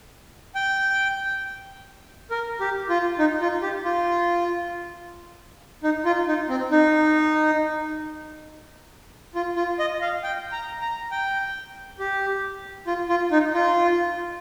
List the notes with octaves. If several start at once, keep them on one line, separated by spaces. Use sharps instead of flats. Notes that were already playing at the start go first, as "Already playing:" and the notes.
G5
A#4
G4
F4
D#4
F4
G4
F4
D#4
F4
D#4
C4
D#4
F4
F4
D#5
F5
G5
A#5
A#5
G5
G4
F4
F4
D#4
F4